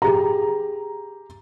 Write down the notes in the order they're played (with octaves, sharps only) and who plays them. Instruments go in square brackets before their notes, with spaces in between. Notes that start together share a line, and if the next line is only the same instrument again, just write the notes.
[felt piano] G4 G#4 A#5